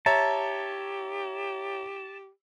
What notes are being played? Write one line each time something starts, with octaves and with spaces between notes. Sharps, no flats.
G4 C#5 E5 A5 A#5